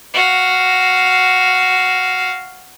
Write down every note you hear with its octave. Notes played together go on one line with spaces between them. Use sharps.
F#4 F5